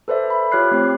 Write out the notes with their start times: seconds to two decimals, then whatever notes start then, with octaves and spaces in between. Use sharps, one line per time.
0.08 A4 B4 C5 D5 E5
0.30 B5
0.52 F4 G4 C#5 F6 F#6 C7
0.71 A3 C4 G4